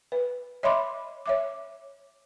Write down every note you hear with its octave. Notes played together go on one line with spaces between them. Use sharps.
B4
C#5 D#5 E5 B5 C6 D6
C#5 E5 D6